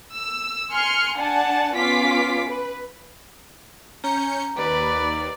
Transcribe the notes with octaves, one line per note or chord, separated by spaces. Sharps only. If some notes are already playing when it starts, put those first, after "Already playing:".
E6
G#5 C6 F6 C#7
D4 F#5 G#5 A5
B3 C#4 F4 D6 B6
B4
C#4 A#5 G6 C#7
D#2 B4 D5